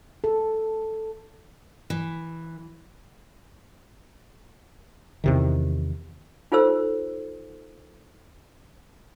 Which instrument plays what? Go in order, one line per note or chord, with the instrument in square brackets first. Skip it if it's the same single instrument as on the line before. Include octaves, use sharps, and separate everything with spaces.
[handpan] A4
[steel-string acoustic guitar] E3
[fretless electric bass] E2 C3 D#3
[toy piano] D#4 F4 A4 C5 E6